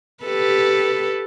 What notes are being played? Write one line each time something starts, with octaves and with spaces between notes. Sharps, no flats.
G4 A4 B4